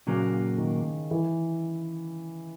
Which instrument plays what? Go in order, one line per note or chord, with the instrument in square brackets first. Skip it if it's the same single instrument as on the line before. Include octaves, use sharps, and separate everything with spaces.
[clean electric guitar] A#2 F#3 A#3 [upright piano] C#3
[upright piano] D#3
E3